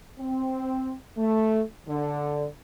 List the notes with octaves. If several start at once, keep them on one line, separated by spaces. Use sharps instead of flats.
C4
A3
D3